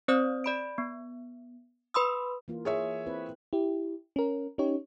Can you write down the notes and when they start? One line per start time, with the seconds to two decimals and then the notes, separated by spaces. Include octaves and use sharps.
0.08 C4 C5 D5 D#6
0.44 D5 B5 D7
0.78 B3
1.94 B4 B5 C6 D#6 E6
2.48 E3 A#3 F4
2.65 G#4 C#5 E5
3.06 C4 E4 B4
3.53 E4 G4
4.16 C#4 A#4
4.58 C#4 D#4 G4 C#5